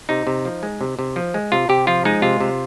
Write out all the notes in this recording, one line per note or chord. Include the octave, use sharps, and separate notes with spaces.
C3 D#4
C3
F3
G#3
C3
C3
F3
G#3
C3 F4
C3 G4
F3 F4
G#3 D#4
C3 F4
C3